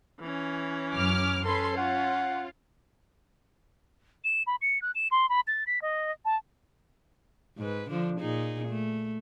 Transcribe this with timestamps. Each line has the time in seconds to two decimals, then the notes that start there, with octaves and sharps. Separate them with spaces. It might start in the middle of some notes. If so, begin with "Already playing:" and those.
0.20 E3 C#4
0.95 F#2 D6 F6
1.45 C#4 A4 B4 C6
1.77 F4 F#5
4.24 E7
4.47 B5
4.62 C#7
4.82 F#6
4.95 E7
5.11 C6
5.29 B5
5.47 A6
5.67 B6
5.82 D#5
6.25 A5
7.58 G#2 B4
7.90 D3 F3 D4
8.20 A#2 D#4 G#4
8.68 A3